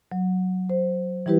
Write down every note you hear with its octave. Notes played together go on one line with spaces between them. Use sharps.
F#3
C5
E3 G3 E4 G4 B4